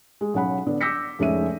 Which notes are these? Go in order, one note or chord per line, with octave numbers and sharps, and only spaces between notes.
G#3
B1 C#4 F#5 B5
D3 B3 D4
D6 E6 G6 A#6 B6 C#7
F1 G#3 C#4 D#4 E5 D#7